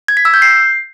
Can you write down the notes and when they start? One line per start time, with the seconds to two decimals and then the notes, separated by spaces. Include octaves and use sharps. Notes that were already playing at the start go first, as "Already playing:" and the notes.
0.08 G#6
0.17 B6
0.25 E6
0.34 G6
0.42 C7